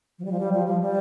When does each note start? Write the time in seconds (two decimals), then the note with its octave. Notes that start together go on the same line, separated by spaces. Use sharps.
0.19 F3
0.25 G3
0.32 F3
0.40 G3
0.53 F3
0.67 F3
0.81 G3